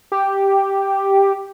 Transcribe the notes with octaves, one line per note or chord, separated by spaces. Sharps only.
G4